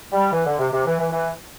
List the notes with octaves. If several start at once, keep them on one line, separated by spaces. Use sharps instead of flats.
G3
E3
D3
C3
C3
E3
E3
E3